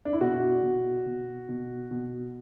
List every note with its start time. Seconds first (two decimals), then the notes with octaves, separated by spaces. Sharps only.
0.05 D4
0.13 E4
0.21 B2 F#4
0.63 B2
1.06 B2
1.49 B2
1.91 B2